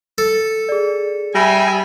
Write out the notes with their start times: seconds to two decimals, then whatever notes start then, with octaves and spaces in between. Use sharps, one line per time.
0.18 A4
0.69 G#4 D5
1.35 G3 E5 G#5 B5 A#6